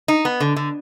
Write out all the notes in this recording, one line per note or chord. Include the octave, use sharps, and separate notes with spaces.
D#4
B3
D3
D3